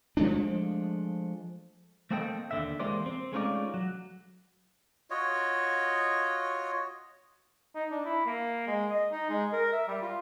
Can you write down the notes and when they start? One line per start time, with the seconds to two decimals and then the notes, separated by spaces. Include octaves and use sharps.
0.17 F3 G#3 A3 D4
2.11 A3 A#3 C4 A4 D#5 G5
2.51 D#2 D3 E5
2.79 E3 G#3 A#3 G4 C5 D5
3.06 C4
3.33 G#3 A3 C#4 D#4 F4 D5
3.74 F#3
5.10 F4 F#4 C#5 D#5
7.75 D#4
7.91 D4
8.05 E4
8.26 A#3
8.67 G#3
8.90 D#5
9.12 D#4
9.30 G#3
9.53 A#4
9.73 E5
9.88 G3
10.02 F4